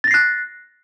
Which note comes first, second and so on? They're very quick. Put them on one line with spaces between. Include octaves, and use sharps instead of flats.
A6 A#6 C7 F#6